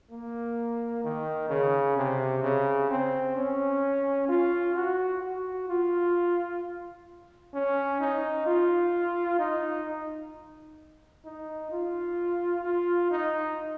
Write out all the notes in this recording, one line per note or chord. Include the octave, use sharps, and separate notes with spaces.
A#3
D#3
C#3
C3
C#3
C4
C#4
F4
F#4
F#4
F4
C#4
D#4
F4
D#4
D#4
F4
F4
D#4